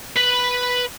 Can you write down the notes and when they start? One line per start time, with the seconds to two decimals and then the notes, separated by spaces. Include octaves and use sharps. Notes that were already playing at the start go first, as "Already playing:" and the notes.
0.17 B4 B5